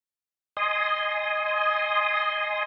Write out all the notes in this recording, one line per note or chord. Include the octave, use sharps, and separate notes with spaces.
D#5 G#5 C6 D#6